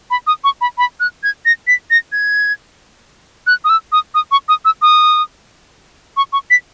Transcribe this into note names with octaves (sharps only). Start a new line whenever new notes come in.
B5
D#6
C#6
B5
B5
F#6
G#6
A#6
B6
A#6
G#6
F#6
D#6
E6
D#6
D#6
C#6
D#6
E6
D#6
C#6
C#6
B6